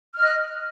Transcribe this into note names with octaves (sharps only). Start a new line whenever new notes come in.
D#5 F6 F#6